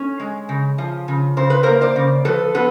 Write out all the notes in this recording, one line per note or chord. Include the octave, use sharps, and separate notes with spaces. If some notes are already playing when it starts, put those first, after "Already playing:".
Already playing: C#4 A4
G#3
C#3
F3
C#3
C#3 C5
B4
A#3 A#4 C5
C5 D5
C#3
F3 A4 B4
B3 A4 B4